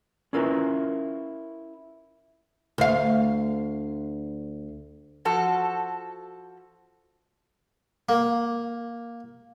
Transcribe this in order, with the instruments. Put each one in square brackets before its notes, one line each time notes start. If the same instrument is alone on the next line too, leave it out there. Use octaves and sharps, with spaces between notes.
[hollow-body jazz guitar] C#4 E4 F4 A#4 B4
[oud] D2 F5
[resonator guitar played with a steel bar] F3 F#4 A4
[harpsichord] A#3